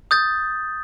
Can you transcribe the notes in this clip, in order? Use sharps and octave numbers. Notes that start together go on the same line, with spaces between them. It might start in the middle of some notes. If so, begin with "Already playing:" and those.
D#6 G6 A6